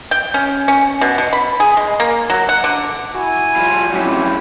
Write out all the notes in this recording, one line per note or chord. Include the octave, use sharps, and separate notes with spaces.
G5
C#4
C#4
B2
B2
B5
G#4
G#3
A#3
F#3
F#5
D3
E4 F#4 G#5
F3 G3
F2 A2 F#3 C#4 E4 G4